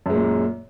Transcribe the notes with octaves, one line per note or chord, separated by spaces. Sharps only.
F#2 A#2 G#3